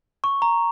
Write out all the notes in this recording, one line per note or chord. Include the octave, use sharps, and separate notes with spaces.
C#6
A#5